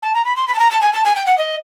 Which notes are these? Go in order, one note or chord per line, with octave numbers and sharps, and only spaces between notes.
A5
A#5
B5
C6
B5
A5
A#5
A5
G#5
A5
G#5
G5
F#5
D#5